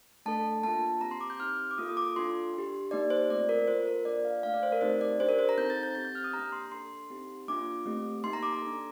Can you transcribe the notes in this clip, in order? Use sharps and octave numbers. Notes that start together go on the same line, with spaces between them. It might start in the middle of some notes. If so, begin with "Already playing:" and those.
A3 D4 A4 A5
A#3 D4 F4 A5
C4 G4 A#5
C6
D6
G6
C4 D#4 G4 F6
D6
A#3 F4 A4 D#6
D#6
D6
D4 F4 A4 C6
D4 G4
A#3 D#4 G4 D5
C5
A3 C4 F4 A4 D5
A#4
A#3 F4 A4 C5
A#4
A#3 D4 F4 D5
F5
A3 D4 A4 F5
D5
C5
A#4
A3 C4 D#4 G4 C5
D5
D4 G4 C5
A#4
C5
A#5
C4 D#4 A4 G6
A6
G6
C4 G4 A6
G6
F6
D#6
A#3 D4 G4 A#5
C6
D4 A4 C6
C4 D#4 G4
A#3 D4 F4 D6
A3 C4 G4
A#3 D#4 G4 C6
A#5
D6
A#5
D4 A4